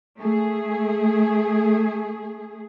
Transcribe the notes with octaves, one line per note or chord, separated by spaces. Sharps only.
A3 G#4